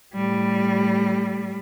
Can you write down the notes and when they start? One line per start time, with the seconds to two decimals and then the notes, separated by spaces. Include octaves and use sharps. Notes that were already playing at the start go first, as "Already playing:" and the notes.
0.14 A2 G3